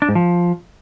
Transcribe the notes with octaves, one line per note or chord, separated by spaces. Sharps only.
D4
G#2
F3